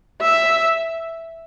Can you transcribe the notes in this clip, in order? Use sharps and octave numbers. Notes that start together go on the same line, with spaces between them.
E5